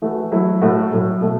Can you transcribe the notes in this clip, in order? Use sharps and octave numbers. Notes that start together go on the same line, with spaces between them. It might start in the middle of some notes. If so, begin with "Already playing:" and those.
E3 A3 F#4
F#3 A3 E4
A2 A3 F#4
A2 F#3 A3
B2 A3 F#4